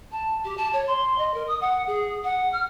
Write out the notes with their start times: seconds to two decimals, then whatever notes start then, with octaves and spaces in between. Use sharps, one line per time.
0.11 A5
0.44 G4
0.57 A5
0.73 C#5
0.87 C6
1.18 D#5
1.34 A#4
1.47 D#6
1.61 F#5
1.87 G#4
2.24 F#5
2.52 F6